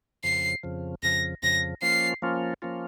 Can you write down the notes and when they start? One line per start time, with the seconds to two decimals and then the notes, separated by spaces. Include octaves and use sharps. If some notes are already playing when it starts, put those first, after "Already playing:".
0.24 F2 C#3 F3 C7
0.63 F2 C#3 F3
1.03 F2 C#3 F3 A#6
1.43 F2 C#3 F3 A#6
1.82 F3 A#3 C#4 F4 C7
2.22 F3 A#3 C#4 F4
2.62 F3 A#3 C#4 F4